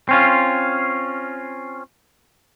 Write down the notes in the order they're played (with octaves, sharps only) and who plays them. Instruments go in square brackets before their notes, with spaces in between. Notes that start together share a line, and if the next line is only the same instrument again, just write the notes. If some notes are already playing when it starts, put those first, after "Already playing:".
[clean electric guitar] C4 C#4 F4